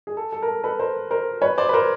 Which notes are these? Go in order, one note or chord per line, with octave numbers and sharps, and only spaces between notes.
G#4
A4
A4
A#4
A4
A4 B4
A#4 C5
A#4 C5
B4 C#5
C5 D5
B4
A#4 C5